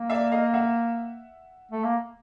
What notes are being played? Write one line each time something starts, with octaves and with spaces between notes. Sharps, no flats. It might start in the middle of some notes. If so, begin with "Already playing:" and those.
Already playing: A#3
D5 E5
D#5 F5
E5 F#5
A3
A#3